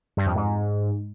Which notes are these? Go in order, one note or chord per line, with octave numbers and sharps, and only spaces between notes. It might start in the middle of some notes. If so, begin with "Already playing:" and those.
G2
F2
G#2